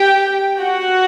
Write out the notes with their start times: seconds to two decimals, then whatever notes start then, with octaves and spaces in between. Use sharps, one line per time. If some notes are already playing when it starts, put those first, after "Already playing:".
Already playing: G4 G5
0.61 F#4 F#5